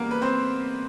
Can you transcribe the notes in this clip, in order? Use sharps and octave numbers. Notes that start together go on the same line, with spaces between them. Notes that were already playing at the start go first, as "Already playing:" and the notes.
Already playing: C#3 E3 G3 A#3 B3 A#4
B4
C4 C5